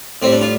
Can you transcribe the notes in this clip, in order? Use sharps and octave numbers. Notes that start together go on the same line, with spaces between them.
A2 G3 C4
D4
F4